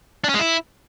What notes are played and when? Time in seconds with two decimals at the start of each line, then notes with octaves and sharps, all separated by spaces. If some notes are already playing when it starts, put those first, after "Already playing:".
0.24 D4
0.29 C#4
0.34 G#3
0.39 E4